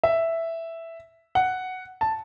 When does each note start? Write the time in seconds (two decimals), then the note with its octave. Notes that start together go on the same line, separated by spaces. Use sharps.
0.03 E5
1.35 F#5
2.01 A5